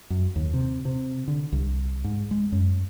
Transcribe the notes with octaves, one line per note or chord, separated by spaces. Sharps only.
F#2
D#2
C3
C3
D3
C2
G#2
G#3
F#2